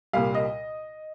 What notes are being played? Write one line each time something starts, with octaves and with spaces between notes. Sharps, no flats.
C2 A#2 G3 F5
D#5